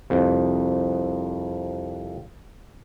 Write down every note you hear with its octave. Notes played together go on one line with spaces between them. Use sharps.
C2 F2